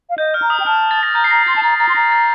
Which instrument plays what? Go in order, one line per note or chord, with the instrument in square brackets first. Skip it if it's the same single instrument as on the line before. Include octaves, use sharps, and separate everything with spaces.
[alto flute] F5
[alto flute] D#5 [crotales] G6
[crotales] F6
[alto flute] A#5
[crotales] D#6
[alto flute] G5
[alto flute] A5 [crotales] F6
[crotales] A6
A#6
[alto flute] A#5 [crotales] G6
[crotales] C7
[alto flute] A#5 [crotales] A#6
[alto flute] C6 [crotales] A6
[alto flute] A5
[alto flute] A#5 [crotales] A6
[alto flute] A#5 [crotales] A6
[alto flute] C6
[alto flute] A#5 [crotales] A#6
[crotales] A6